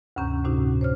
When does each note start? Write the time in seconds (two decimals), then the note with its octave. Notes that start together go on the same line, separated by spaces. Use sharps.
0.16 D2 G2 C3 C#4 A#5 G6
0.44 A2 C3 D4 D#4 F#4
0.81 C5 C#5 F6